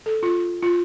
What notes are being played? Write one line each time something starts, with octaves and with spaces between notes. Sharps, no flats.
A4
F4
F4